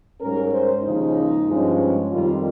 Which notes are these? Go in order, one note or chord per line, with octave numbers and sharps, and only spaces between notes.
G#2 G3 C#4 A#4
C5
D#2 C#3 F3 G#3 D#4
G2 F3 G#3 C#4
F2 D#3 G3 F4